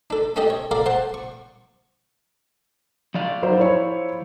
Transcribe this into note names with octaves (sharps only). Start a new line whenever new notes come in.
D4 A4
C#4 D4 G4 A4 D#5
C#5
A4 A#4 D5 F5
C5 F#5 A5 C6
C#6
F3 D5 F5
F#3 D#4 C5
E4 C5 C#5